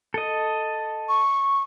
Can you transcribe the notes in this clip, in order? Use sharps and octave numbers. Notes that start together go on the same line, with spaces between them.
A4 D#5
C#6